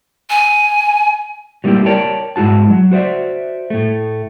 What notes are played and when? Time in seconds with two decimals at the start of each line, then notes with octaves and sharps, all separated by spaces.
0.30 G#5
1.64 F#3 G3 A3 A#3 E4 G4
1.86 A#4 C#5 D5 G5 A5
2.36 G#2 G#3 E4 F#4 A5
2.70 F#3
2.91 F#4 C5 D5 E5
3.70 A2 A3